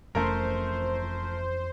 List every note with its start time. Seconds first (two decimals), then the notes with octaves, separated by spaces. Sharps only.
0.15 F1 F2 E3 A3 C#4 A#4 C5